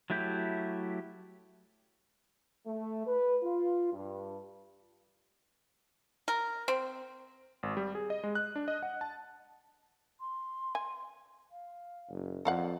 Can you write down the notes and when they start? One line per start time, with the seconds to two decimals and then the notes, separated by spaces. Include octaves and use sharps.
0.10 F#3 A3 E4 G4 G6
2.67 A3
3.07 B4
3.44 F4
3.93 G2
6.28 A#4
6.68 C4
7.63 G#1
7.77 G3
7.95 G#4
8.10 D#5
8.24 G#3
8.35 F#6
8.56 D4
8.68 D#5
8.83 F#5
9.01 A5
10.20 C6
10.75 G#5
11.51 F5
12.10 F#1
12.45 F2 A4 D5 F5 F#5